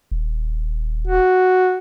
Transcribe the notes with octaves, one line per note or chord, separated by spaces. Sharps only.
D#1
F#4